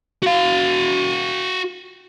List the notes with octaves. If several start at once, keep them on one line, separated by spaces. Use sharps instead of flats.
F#4 F5